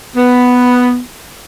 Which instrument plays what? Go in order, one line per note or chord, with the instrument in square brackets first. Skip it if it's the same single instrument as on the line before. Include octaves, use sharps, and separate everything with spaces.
[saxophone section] B3